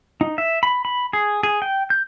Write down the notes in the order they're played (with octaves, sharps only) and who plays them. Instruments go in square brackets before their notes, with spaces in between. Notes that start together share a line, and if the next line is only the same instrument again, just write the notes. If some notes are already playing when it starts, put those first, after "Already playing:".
[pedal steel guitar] D#4
E5
B5
B5
G#4
G#4
G5
G6